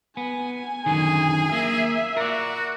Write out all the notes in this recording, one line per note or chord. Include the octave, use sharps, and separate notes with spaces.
B3 G#5
F#2 D3 D#3 G#4
A#3 E5
F#4 A#4 D5